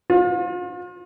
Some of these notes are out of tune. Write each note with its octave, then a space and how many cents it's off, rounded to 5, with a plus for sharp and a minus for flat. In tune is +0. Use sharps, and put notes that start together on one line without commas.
F4 +40